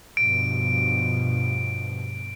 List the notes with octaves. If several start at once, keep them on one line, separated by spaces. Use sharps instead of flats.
G2 B2 F3 D7